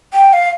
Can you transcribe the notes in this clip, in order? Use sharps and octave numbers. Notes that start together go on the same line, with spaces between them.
G5
F5